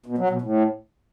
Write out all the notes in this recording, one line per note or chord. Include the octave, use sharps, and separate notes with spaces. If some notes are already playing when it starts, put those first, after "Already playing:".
B2
F#3
B2
A2